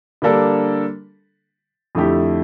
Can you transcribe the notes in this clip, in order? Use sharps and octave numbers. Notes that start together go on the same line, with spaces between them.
D3 G3 A#3 D4 A4
F2 D3 A3 E4 G4